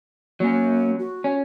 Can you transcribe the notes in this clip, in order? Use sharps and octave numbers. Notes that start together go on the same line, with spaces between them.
F#3 A#3 C#4
F#4
C#4